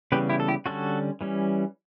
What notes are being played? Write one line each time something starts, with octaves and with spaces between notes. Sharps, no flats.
C#3 E3 G3 B3 G4 B4
E4 G4
A4
E4 G4
D3 G3 C#4 F#4 A4
E3 G3 C#4